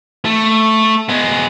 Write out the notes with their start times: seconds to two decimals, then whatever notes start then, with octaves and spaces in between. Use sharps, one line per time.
0.25 A3
1.09 G#3 B3